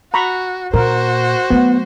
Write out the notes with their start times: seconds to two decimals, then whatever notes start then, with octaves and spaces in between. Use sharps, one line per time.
0.14 F#4 A#5 B5 C#6
0.74 A#2 F#4 A#4 C5
1.50 F#3 A3 B3